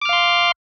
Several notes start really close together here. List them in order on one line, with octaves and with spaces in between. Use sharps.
D6 F6 F5 C6